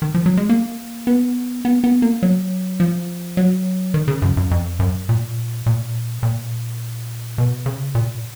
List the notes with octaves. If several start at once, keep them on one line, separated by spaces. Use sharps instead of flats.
D#3
F3
F#3
G#3
A#3
B3
B3
B3
A#3
F#3
F3
F#3
D#3
C#3
F#2
F#2
F2
F#2
A#2
A#2
A#2
B2
C#3
A#2